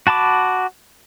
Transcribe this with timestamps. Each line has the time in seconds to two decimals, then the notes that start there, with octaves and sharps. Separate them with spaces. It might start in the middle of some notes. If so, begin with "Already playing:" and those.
0.07 F#4 A5 B5 D6